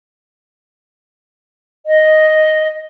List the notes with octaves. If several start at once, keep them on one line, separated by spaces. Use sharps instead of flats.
D#5